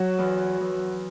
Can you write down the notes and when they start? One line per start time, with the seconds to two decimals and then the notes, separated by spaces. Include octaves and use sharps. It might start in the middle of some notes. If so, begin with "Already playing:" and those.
Already playing: F#3 F#4
0.18 E2
0.60 E2